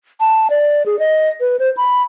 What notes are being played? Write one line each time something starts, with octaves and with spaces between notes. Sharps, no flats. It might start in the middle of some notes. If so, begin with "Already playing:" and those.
A5
D5
G#4
D#5
B4
C5
B5